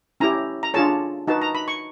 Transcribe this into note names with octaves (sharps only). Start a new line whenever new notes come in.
C#4 E4 G4 A#5
A#5
D4 F4 G#4 C#5 A5
D#4 F#4 B4 A5
A#5
B5
C#6